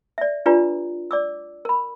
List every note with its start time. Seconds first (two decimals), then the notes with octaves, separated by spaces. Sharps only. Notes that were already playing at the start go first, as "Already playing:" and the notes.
0.18 D5 E5
0.46 D4 F4 G4 B4 D5 A#5
1.11 D5 D6 E6
1.65 A#4 B5